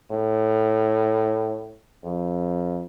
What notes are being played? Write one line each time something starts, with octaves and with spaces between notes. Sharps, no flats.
A2
F2